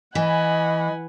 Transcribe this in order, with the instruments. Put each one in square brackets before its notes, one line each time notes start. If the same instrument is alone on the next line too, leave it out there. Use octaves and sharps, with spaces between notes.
[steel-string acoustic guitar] E3 [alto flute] D#5 [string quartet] F#5 G#5 B5